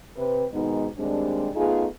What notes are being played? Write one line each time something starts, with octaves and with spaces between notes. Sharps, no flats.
C3 B4
G#2 B2 D#3 G#3 B3 D#4
D#2 G3 G#3 C4 D4
A3 B3 D#4 F4 G#4